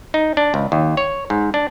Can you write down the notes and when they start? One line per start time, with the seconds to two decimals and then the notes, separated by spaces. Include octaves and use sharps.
0.14 D#4
0.37 D4
0.54 C#2
0.72 D#2
0.97 C#5
1.30 G#2
1.54 D4